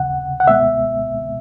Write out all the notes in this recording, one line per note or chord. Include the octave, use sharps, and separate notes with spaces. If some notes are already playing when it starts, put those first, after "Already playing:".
Already playing: D#2 C#3 F#5
F#5
C#2 B2 G#3 B3 E5